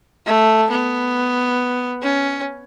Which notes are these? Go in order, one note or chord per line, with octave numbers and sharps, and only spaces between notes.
A3
B3
C#4